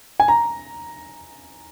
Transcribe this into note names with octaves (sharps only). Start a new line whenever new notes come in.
G#5
A#5